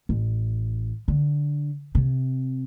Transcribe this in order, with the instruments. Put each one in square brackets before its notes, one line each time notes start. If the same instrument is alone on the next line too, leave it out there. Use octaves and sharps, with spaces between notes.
[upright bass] A1
D3
C3